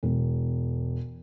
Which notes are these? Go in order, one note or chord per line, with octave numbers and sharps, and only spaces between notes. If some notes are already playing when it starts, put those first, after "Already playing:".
E1